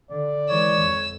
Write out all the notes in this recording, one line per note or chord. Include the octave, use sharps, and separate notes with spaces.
D3 D5
E3 G#3 C#5 E6
F2